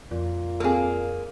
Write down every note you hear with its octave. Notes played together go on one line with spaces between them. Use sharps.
F2 A#2
A#3 C4 G#4 A4